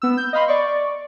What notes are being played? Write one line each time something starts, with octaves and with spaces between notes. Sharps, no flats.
B3 E6
G6
D#5 F5 B5 C6
D5 C#6